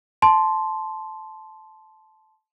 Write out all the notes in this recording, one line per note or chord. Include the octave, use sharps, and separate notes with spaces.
A5 C6